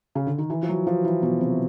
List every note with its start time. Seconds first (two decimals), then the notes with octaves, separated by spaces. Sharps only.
0.15 C#3
0.27 D3
0.38 D#3
0.50 E3
0.63 F3
0.69 F#3
0.87 F3
1.05 E3
1.22 B2
1.41 C3